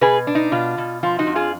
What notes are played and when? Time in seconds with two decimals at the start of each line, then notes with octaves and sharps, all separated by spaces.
0.01 B2 G#4 B4
0.27 D4
0.35 D#4
0.52 B2 F4
0.78 B2
1.03 F3 F4
1.19 D#4 F#4
1.27 F2
1.35 F4 G#4